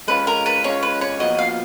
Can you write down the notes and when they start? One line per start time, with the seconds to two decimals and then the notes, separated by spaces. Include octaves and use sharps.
0.08 G#3 C#4 F4 B4
0.27 A#4
0.46 B4
0.64 G#3 C#4 F4 C#5
0.83 B4
1.01 C#5
1.20 A#2 F3 B3 F#4 D#5
1.39 F5